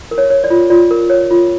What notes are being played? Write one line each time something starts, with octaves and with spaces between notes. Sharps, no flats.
A#4
C#5
C#5
D5
F4
F4 D5
A#4
C#5
F4